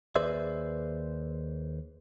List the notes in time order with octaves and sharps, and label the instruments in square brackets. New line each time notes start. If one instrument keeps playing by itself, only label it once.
[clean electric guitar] D#2 G#4 B4 C5 D5 E5